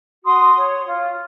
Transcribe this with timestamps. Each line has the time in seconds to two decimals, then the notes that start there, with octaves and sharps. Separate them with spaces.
0.25 F#4 C6 D#6
0.56 C#5
0.86 F4